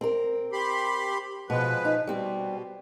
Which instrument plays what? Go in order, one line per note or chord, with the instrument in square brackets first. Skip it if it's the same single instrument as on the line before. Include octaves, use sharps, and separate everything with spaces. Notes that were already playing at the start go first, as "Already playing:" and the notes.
[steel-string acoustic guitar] C4 A#4
[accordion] G4 B5 C6
[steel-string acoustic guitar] B2 [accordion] F3 G#3 B4
[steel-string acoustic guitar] D#4
[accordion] B2 [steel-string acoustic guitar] G3 C4